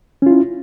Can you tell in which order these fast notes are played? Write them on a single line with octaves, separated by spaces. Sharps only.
C#4 F4 E4